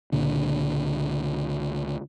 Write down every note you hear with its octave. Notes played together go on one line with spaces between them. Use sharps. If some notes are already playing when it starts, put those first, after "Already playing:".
C#2 A#2 D3